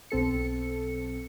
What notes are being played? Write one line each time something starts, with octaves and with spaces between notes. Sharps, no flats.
B1 C4 A4 C#7